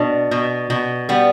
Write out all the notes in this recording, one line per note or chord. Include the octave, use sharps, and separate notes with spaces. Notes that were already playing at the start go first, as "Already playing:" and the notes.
Already playing: B2 D4
B2
B2
G3 B3